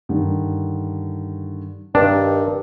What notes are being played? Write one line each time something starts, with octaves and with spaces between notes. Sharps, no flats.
G2 D3 D#3
G2 D#3 D4